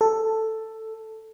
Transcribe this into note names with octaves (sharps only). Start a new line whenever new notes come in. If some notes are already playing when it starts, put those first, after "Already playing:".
A4